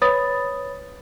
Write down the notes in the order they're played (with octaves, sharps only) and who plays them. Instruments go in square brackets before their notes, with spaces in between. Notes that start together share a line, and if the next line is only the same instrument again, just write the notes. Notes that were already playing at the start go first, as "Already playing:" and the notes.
[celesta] B4 C#5 B5 D#6 A6